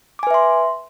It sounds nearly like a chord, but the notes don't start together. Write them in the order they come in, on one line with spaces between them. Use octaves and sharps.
D6 G#5 B4 E5 C6